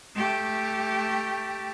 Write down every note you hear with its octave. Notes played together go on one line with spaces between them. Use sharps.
A3 G4